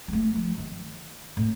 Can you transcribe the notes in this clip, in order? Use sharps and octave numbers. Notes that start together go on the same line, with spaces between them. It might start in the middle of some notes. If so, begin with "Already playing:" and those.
G3
A3
F3
D#3
A2